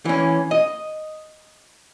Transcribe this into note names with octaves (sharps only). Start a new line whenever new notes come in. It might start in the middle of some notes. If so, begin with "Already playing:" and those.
E3 C#4
D#5